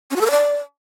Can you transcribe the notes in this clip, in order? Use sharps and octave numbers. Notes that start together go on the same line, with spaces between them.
C#4
F#4
A4
A#4
D5